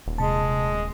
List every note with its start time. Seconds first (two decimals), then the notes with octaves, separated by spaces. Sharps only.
0.06 D#1
0.18 C3 G#3 A5